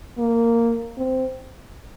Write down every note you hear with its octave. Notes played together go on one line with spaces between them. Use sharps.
A#3
C4